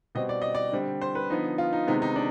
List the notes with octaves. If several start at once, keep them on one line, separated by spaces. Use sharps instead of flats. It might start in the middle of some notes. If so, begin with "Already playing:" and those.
B2 G3 C4 D#5
D5
D#5
D5
D3 G3 C4
C5
B4
D3 F3 B3 D#4
F4
D#4
C3 D#3 G#3 B3 D#4
D#4
D4